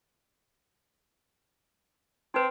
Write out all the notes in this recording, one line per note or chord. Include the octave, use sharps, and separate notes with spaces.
C4 D#4 B4